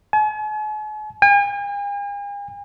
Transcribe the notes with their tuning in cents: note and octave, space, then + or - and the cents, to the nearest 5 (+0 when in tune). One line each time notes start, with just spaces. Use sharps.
G#5 +45
G#5 -45